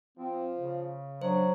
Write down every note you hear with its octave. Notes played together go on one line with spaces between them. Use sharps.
F3 C4
C#3
F#3 D4 C5